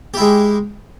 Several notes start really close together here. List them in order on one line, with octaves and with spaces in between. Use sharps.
G4 E4 G#3